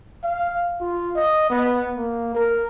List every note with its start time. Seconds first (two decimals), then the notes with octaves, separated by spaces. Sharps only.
0.24 F5
0.81 F4
1.16 D#5
1.50 B3
1.97 A#3
2.34 A#4